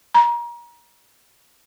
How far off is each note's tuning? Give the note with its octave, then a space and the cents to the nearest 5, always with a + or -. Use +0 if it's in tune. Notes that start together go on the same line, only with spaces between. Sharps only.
A#5 +30